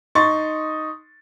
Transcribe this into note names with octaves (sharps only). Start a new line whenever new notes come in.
D#4 C6 C#6 A6